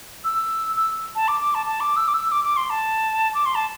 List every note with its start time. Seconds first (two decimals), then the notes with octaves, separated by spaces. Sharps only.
0.25 E6
0.77 E6
1.15 A5
1.28 D6
1.41 D6
1.55 A5
1.66 A5
1.80 D6
1.96 E6
2.08 D6
2.14 E6
2.32 D6
2.44 D6
2.57 C6
2.70 A5
3.35 D6
3.46 C6
3.55 A5